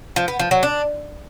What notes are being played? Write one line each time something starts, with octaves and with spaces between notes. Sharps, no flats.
F3
B3
F3
F#3
D4